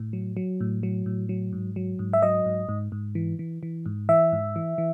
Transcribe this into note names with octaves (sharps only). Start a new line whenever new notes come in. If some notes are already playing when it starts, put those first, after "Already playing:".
Already playing: A2
F#3
F#3
A2
F#3
A2
F#3
G#2
F#3
G#2
E5
F#3 D#5
G#2
G#2
G#2
E3
E3
E3
G#2
E3 E5
G#2
E3
E3